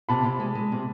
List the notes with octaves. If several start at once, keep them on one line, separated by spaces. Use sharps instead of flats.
C3 A5 B5
C3
G#3
G#3
C3